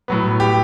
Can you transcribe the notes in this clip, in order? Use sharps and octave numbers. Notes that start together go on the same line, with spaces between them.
A2 F#3 B3
G4